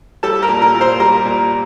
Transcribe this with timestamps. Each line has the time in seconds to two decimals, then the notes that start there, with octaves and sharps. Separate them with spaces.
0.23 G3 A4 A5
0.42 A#4 A#5
0.49 A#2
0.62 A#4 A#5
0.74 A#2
0.81 C5 C6
1.00 G3 A#4 A#5
1.25 A#2